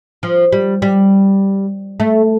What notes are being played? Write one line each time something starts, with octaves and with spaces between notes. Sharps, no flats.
F3
G3
G3
A3